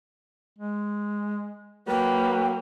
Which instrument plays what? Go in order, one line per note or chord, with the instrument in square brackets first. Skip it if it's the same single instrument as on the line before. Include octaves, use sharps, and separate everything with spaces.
[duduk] G#3
[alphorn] F#3 [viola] A#3 [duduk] B4 [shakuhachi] G5